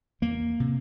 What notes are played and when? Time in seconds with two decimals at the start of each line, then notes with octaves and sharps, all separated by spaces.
0.22 E2 A#3
0.60 C3